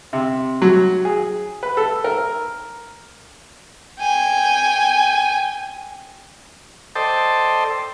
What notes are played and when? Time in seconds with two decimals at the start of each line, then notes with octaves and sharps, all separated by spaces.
0.13 C3
0.62 F#3
1.05 G#4
1.63 B4
1.77 A4
2.04 A#4
4.00 G5 G#5
6.95 A4 C5 D5 D#5 G5 A5